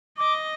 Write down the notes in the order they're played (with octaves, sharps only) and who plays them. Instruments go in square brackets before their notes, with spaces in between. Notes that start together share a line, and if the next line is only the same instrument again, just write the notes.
[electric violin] D#5 [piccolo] D6